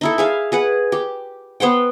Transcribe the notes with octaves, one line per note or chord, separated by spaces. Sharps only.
D#4 E4 A4
G#4 E5 F5
G#4 B4 F#5
G4
B3 C5 F#5 G5